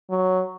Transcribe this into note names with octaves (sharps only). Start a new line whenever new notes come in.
F#3